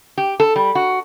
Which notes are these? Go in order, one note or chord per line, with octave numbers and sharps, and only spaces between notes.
G4
A4
G3
F#4